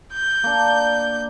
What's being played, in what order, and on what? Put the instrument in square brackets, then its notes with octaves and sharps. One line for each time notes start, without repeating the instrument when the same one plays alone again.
[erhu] G6
[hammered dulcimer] A#3 D4